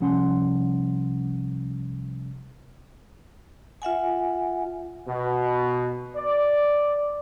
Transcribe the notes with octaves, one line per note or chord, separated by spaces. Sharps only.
C2 F3 C#4 F#5 A5 C6
F4 E5 F#5 G#5
B2
D5